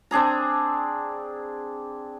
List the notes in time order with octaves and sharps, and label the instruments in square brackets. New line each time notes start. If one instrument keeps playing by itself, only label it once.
[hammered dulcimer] C4 D4 G#4 A#5